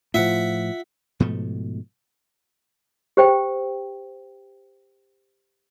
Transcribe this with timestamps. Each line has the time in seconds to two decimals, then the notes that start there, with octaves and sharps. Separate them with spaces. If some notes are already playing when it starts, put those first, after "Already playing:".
0.14 A2 F3 F4 E5 F#5
1.20 G#2 B2 F3 A3
3.17 G4 C5 G5